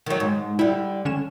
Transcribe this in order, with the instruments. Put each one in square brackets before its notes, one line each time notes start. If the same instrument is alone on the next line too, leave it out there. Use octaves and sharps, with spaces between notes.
[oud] D#3 F#3
G#2
[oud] D3 G3 [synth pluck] E4
[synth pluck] D3 C#4 E7